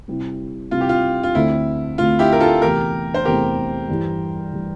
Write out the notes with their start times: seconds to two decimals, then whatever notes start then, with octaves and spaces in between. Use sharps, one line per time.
0.08 C3 G3 C4 E4
0.71 C3 G3 C4 E4 F4
0.81 G4
0.89 F4
1.23 F4
1.35 D2 D3 A3 C4 E4
1.98 D2 D3 A3 C4 F4
2.19 E4 G4
2.32 A#4
2.40 F4 A4
2.62 E2 C3 E3 A3 G4 A#4
3.14 C5
3.25 E2 C3 E3 A3 G4 A#4
3.88 G2 E3 G3
4.53 E3 G3